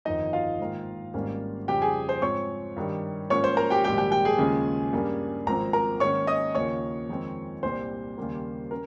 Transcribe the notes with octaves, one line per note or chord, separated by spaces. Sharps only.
G1 F2 D#3 D#4 D#5
F4 F5
G#2 D#3 A#3
G#1 G#2 G3 A#3 C#4
F2 C#3 G3 G4 G5
G#4 G#5
C5 C6
G#2 F3 C4 C#5 C#6
G2 D#3 G3
G#2 F3 A#3 C#4 C#5 C#6
C5 C6
A#4 A#5
G4 G5
A#1 G#2 D#3 G3 G4 G5
G4 G5
G4 G5
G#4 G#5
D#2 C#3 F3 G#3 C#4
G2 G3 A#3 C#4
G#1 G#2 F3 C4 A#4 A#5
A#4 A#5
G#2 D#3 A#3 C#4 C#5 C#6
D#5 D#6
D#2 C#3 F3 A#3 C#5 C#6
F2 D#3 G#3 C4
C2 A#2 G3 C4 C5 C6
D#2 C#3 G3 A#3
C#4 A#4